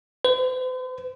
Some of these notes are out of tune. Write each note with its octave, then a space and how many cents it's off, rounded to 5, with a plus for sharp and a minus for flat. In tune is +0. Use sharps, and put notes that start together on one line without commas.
C5 -45